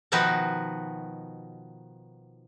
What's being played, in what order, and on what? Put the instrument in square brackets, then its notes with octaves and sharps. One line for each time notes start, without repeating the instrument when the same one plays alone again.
[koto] B2 D#3 F3 D#4 F#4 B4